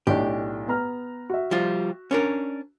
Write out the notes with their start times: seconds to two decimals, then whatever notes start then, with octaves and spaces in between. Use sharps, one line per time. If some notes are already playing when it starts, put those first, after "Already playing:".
0.07 B1 A2 D4 G4
0.68 B3 A#5 F6
1.30 F#4 E5
1.51 F3 G3 F4
2.11 C#4 D4 A#4